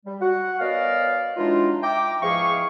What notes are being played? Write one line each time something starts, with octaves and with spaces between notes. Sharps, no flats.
G3
F#4 F#5
B3 C#4 A#4 D5 D#5 F5
E3 F#3 G#3 D4 D#4 F4
E5 G5 A#5 D6
E2 G#2 F3 G#4 F5 C#6